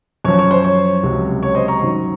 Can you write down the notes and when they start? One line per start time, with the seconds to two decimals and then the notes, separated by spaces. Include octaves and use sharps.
0.25 F#2 F3 C#5
0.39 C#5
0.51 C5
0.64 C#5
1.03 C#2 C3 F#3
1.43 C#5
1.55 C5 D#5
1.68 A#5 C#6
1.81 F#2 D#3 F#3